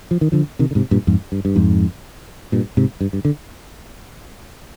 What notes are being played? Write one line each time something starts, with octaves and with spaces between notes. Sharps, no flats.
F3
D#3
D3 F3
C3 D#3
D3
G#2 C3
G2 A#2
F2 G#2
G2
G2
F2 G#2
G2 A#2
G#2 C3
G2
G2
D3